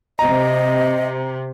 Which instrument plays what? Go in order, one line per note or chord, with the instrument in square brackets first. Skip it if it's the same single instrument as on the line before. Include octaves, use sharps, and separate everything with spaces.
[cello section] C3 [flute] D#5 [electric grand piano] A#5